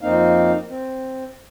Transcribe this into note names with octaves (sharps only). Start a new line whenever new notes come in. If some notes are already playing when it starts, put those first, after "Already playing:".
F2 A#3 C4 D#4 F5
C4